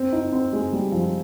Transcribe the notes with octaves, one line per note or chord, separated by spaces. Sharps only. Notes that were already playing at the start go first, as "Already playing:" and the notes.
Already playing: C4
D#4
C4
G#3
G3
F3